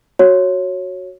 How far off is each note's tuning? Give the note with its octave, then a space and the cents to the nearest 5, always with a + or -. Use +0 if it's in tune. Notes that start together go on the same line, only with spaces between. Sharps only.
F#4 +0 C#5 -10